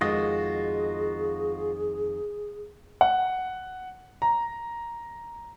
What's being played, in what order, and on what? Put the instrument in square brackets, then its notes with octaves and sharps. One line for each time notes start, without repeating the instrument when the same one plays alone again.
[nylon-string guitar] F2 D#3 G#3 [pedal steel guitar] F4 F#4 D#5 [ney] G#4
[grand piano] F#5
A#5